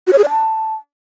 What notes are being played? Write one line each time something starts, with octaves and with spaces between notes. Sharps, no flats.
F#4
C#5
G#4
D5
A5